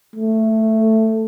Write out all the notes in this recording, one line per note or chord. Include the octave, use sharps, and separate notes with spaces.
A3